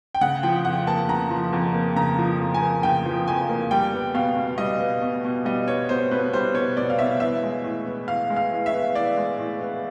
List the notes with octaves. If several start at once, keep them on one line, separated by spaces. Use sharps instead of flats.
G5
C#3 F#5
F3 G5
F2 F#5
A#3 A5
C#3 A#5
F3
F2
A#3
C#3 A#5
F3
F2
G#5
A#3
C#3 G5
F3
F2 G#5
A#3
G3 G5
B3
B2 F5
B2
G3 D#5
B3
B2
B2
G3 D#5
B3 C#5
B2 C5
B2 B4
G3 C5
B3 C#5
B2 D5
F5
B2 E5
E3 E5
G#3
A2
B3
E3 F5
G#3
F5
A2
E5
B3
E3 D5
G#3
A2
B3